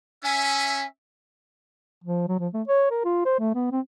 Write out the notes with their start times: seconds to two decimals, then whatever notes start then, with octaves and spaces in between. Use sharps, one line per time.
0.24 C#4 E5 G#5
2.04 F3
2.28 F#3
2.39 F3
2.54 A3
2.68 C#5
2.91 A#4
3.05 F4
3.25 C5
3.40 A3
3.55 B3
3.72 C4